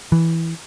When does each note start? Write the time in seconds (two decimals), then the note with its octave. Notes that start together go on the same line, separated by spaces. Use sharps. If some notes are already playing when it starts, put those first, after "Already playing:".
0.12 E3